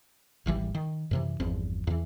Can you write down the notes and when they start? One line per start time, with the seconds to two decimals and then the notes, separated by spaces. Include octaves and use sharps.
0.46 D#1 G#1 E3 G3
0.75 D#3
1.11 F#2 C3 E3
1.40 G1 E2 F3 C4
1.87 E2 E3